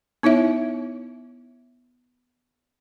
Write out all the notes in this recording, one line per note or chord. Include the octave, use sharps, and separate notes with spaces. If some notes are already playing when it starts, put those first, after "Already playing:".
B3 D#4 E4 C#5 E5